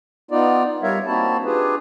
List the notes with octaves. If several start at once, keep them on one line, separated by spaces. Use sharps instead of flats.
B3 D#4 F4 D5
G3 A#4 C#5 E5 F5
A#3 C4 D#4 E4 F#4 A5
D4 F4 G4 G#4 B4